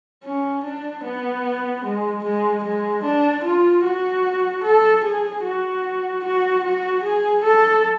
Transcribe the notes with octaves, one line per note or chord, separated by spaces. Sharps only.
C#4
D4
B3
G#3
G#3
G#3
D4
F4
F#4
A4
G#4
F#4
F#4
F#4
G#4
A4